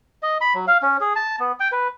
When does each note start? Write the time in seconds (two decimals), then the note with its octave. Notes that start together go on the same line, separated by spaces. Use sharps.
0.23 D#5
0.41 B5
0.54 F#3
0.67 F5
0.82 C#4
1.01 G#4
1.16 A5
1.39 B3
1.60 G5
1.72 B4